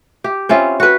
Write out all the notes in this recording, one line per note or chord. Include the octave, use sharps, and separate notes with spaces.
G4
C4 C#4 E4 F4
F#4 B4